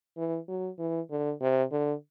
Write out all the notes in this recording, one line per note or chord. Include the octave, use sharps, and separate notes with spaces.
E3
F#3
E3
D3
C3
D3